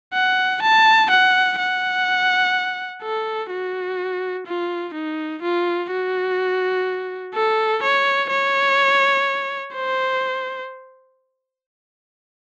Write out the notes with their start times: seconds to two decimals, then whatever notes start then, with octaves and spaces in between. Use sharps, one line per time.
0.14 F#5
0.62 A5
1.11 F#5
1.58 F#5
3.03 A4
3.50 F#4
4.46 F4
4.94 D#4
5.42 F4
5.91 F#4
7.35 A4
7.83 C#5
8.30 C#5
9.75 C5